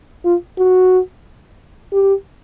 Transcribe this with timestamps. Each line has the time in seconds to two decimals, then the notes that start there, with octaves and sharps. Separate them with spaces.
0.25 F4
0.58 F#4
1.93 G4